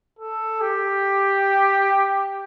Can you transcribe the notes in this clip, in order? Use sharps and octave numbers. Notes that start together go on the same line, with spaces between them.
A4
G4